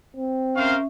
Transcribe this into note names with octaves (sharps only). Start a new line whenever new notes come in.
C4
C#4 A#4 C5 E5 F5